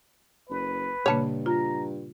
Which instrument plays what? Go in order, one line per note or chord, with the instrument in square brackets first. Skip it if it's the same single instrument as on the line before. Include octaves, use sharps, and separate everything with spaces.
[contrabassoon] F#1 [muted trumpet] B4
[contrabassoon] G2 [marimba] A#2 C#3 A#3 [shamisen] C#5 A5
[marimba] F4 [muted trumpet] A#5